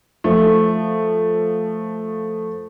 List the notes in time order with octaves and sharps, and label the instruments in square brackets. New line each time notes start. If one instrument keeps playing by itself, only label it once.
[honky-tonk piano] F3 A3